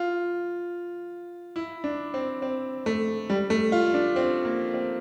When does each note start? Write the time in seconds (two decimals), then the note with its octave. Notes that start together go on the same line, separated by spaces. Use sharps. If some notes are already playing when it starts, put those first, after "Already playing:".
Already playing: F4
1.56 E4
1.84 D4
2.14 C4
2.42 C4
2.86 A3
3.30 G3
3.50 A3
3.72 F4
3.94 D4
4.16 C4
4.45 A#3
4.74 C4